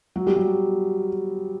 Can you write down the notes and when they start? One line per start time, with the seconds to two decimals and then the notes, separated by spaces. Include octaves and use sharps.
0.16 F#3
0.27 G3
0.36 F#3